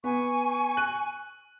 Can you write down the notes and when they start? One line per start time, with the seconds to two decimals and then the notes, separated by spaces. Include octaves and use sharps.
0.04 B3 G#5 C#6
0.77 F#6 D#7